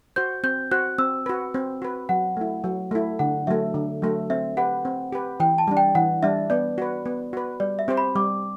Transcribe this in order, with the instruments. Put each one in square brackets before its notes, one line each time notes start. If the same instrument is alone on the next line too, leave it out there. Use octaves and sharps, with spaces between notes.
[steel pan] F#4 C5 [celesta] G6
[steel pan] C4 [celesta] G6
[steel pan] F#4 C5 [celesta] F#6
[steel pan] C4 [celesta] E6
[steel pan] F#4 B4
C4
F#4 B4
[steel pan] F#3 [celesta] F#5
[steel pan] A3 E4
F#3
A3 E4
[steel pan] D3 [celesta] F#5
[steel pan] F#3 A3 [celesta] E5
[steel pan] D3
F#3 A3
[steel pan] C4 [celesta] E5
[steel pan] G4 B4 [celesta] F#5
[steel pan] C4
G4 B4
[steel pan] E3 [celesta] G5
[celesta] A5
[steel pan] G3 D4
[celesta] G5
[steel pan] E3 [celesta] F#5
[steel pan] G3 D4 [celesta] E5
[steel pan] B3 [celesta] D5
[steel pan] F#4 B4
B3
F#4 B4
[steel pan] G3 [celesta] D5
[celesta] E5
[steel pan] C4 G4 C5
[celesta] B5
[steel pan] G3 [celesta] D6